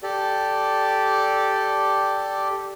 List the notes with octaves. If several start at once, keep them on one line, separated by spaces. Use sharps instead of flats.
G4 A4 D5